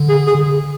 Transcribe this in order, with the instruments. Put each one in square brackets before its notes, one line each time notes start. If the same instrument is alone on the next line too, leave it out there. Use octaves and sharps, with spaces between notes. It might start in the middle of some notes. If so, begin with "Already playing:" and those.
Already playing: [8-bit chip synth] D3
[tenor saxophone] G#4
G#4